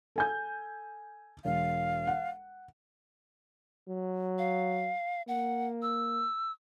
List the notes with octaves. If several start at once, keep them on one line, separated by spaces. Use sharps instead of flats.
A4 G#5 G6
E1 F5
F#5
F#3
F5
A#3 F#5
E6